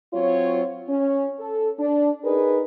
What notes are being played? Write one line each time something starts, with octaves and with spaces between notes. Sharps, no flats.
F#3 C4 F4 C#5
C#4
A4
D4
D#4 G#4 A#4 B4